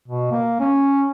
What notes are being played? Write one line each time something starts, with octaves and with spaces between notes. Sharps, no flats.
B2
A#3
C#4